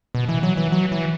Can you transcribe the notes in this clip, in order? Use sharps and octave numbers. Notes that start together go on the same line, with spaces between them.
B2
E3
F#3
E3
F#3
E3